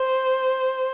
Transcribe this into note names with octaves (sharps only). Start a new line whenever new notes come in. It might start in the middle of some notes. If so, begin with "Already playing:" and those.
Already playing: C5